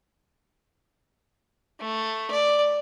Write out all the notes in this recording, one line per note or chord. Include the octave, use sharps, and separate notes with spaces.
A3
D5